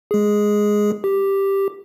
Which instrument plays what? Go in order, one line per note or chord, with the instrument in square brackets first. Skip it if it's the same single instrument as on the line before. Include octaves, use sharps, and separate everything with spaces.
[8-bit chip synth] G#3 G#4
G4